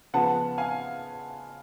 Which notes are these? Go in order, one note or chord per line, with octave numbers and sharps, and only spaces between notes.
C#3 F3 B3 F#5 A5
F5 G#5